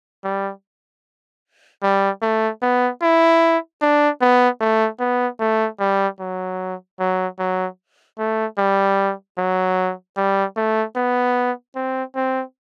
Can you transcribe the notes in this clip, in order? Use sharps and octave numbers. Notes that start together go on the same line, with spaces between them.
G3
G3
A3
B3
E4
D4
B3
A3
B3
A3
G3
F#3
F#3
F#3
A3
G3
F#3
G3
A3
B3
C4
C4